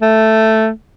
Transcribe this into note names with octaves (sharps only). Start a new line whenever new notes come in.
A3